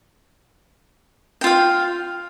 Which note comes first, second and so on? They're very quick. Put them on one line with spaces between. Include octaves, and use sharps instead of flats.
G5 F4 F5